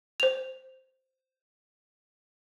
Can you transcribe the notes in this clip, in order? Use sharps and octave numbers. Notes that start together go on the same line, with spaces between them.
C5 F7